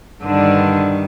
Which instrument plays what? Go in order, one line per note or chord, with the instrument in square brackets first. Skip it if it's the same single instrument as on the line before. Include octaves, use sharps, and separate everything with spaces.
[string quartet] G2 D3 D#3 G3 D4